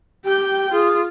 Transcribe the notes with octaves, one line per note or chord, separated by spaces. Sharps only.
G4 G5 G6
F4 G#4